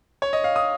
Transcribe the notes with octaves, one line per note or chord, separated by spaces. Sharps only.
C#5
D#5
F5
D#6